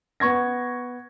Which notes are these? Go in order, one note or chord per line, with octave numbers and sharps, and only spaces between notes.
B3 C#6 G#6 A#6